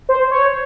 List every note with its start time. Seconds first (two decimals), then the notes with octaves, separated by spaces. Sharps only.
0.09 C5
0.31 C#5